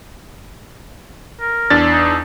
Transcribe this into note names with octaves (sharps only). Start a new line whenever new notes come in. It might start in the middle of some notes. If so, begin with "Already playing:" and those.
A#4
E2 D4 A6
D#4